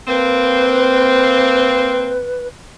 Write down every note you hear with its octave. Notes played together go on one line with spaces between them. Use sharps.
A#3 C4 B4